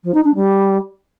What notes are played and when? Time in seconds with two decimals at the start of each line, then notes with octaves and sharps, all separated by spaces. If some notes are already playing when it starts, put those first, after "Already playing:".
0.03 F3
0.14 D#4
0.24 D4
0.34 G3